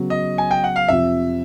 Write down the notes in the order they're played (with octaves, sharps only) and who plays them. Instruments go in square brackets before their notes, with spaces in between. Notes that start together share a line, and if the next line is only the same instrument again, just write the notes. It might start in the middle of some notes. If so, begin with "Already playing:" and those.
Already playing: [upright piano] C#3 F#3 B3
[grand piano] D#5
G#5
G5
F#5
F5
[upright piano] F2 C3 F3 [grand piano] E5